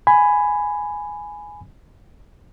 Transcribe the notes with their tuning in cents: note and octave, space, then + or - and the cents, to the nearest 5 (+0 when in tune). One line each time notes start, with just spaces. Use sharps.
G#5 +0 B5 +15